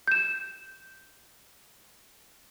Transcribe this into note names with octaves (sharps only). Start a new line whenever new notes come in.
G6 E7